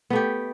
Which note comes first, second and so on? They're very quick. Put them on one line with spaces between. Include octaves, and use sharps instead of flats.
B3 A3 G4